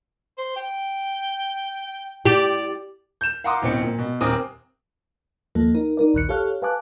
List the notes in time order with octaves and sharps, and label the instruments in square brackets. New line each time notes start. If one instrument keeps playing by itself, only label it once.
[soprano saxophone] C5
G5
[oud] G4 [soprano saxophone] D5
[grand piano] G6 E7
F5 F#5 A#5 C6 D6 D#6
D1 B2 C4 C#7
A#2
B2
D#1 C4 A#4 G#5 D6 D#6
[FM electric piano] D#2 F3 A#3 A4
D#4 A#4
D#4 A#4 D5
A#1 D#2 F#6 C#7
G4 A4 C#5 F5 F6 F#6
B4 F5 G#5 A5 D6 F#6